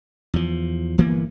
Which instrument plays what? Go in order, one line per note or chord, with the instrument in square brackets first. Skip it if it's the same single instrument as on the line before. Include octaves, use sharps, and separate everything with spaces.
[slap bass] E2 F3
G1 E3 A#3 B3